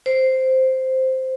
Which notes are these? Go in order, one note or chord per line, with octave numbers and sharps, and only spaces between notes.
C5